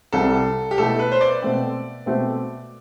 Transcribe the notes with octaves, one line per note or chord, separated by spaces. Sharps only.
C2 C3 G3 A4
G4
B2 A3 E4 A4
B4
C5
D5
B2 A3 C4
B2 A3 C4 F#4